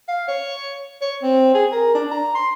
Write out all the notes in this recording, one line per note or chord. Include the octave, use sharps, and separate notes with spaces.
F5
C#5
C#5
C4
G#4
A#4
D4
A#5
C6